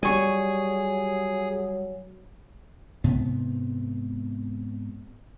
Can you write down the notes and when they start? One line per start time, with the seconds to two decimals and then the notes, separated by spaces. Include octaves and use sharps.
0.03 F#3 G3 G#4 G#5 C#6
3.04 G#2 C3 B3